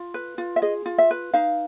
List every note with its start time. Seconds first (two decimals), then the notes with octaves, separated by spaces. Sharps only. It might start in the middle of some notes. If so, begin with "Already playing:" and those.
Already playing: F4
0.14 B4
0.38 F4
0.56 E5
0.62 G#4 D#5
0.86 F4
0.98 E5
1.11 B4
1.34 D#4 F5